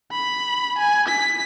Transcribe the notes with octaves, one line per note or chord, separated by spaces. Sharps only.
B5
G#5
B6